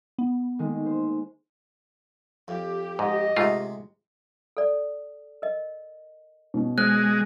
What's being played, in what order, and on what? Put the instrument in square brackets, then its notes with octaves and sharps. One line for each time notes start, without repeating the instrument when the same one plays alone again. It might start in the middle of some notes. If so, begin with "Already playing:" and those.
[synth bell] B3
[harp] D#3 G#3 A#3
C5
[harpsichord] F2 [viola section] G4
[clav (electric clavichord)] G#2 [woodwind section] D#5
[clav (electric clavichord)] G#2 A3 F4 [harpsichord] C3 G#3
[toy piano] A4 D5
A#4 D#5
[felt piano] B2 C#4
[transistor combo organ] G#3 [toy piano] C5 [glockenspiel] F#6